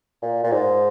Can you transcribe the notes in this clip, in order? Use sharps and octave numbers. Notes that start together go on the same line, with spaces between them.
A#2
A#2
G#2